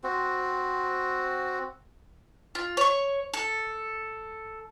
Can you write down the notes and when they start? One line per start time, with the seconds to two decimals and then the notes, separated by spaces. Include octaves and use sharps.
0.04 C4 F#4
2.55 F4
2.77 C#5 C#6
3.34 A4